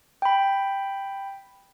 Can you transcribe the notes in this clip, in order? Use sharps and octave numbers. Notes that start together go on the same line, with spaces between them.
G5 B5